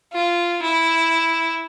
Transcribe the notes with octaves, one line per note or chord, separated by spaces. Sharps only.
F4
E4